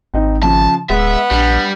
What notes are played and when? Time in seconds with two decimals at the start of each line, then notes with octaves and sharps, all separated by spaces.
0.14 G#1 C4 D#4 D#5
0.43 C#3 F3 A5
0.90 D1 G#3 B3 E5
1.31 A#1 G3 D4